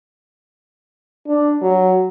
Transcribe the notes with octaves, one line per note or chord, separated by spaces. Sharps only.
D4
F#3